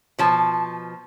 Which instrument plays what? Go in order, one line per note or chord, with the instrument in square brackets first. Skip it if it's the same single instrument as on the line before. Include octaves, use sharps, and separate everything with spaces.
[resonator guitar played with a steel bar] B2 F3 A5